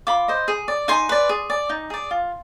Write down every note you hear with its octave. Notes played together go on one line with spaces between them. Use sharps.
F4 B5 D6
C5 D#5
G#4
D5
D#4 G#5 C6
B4 D5
G#4
D5
D#4
G#4 D5
F4